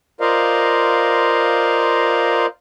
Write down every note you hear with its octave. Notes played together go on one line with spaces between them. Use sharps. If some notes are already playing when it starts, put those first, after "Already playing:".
F4 A#4 C5 D5 D#5 F5